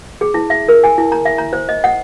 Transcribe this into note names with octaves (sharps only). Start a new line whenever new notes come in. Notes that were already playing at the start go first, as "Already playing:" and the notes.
G#4
E4
E5
A#4
G#5
E4
A#5
E5
A#5
C5
D#5
F#5